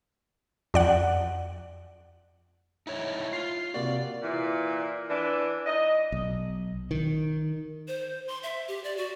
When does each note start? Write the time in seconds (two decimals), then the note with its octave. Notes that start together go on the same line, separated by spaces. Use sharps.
0.74 F2 D5 F#5
2.87 D#4 E4 C#5
3.33 F4 C7
3.74 C3 A#3 F#4 D5
4.22 A#2 E3
5.09 E3 D4
5.66 D#5
6.12 B1
6.91 D#3
7.88 C5
8.28 C6
8.43 E5
8.68 G4
8.84 D5
8.97 F#4